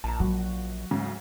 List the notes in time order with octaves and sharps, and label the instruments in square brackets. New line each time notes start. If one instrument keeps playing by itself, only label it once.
[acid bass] A#1 [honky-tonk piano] A5 A#5
[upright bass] F3 F#3 [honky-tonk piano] F#4
[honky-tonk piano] D2 G#2 C#3